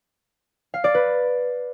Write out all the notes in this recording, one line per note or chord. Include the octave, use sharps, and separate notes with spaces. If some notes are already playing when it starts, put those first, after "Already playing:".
F5
D5
B4